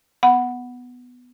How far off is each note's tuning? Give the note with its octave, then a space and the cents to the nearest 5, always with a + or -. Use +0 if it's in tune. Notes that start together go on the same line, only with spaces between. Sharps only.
B3 +5 F#5 +0 B5 +0